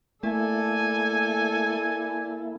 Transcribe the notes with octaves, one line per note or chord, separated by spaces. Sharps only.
A3 A#3 E4 A4 D5 G#5